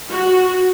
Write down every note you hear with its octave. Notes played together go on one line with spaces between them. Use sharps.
F#4